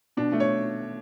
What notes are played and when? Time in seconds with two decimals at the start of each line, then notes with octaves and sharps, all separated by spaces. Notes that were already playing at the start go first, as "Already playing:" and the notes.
0.17 B2 D4
0.32 A3
0.40 C#5